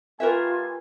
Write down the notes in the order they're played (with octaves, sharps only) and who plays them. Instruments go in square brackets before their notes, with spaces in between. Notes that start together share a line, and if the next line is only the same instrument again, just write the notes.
[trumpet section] A3 G4 G#5 [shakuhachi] F4 [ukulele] A#4 B4 E5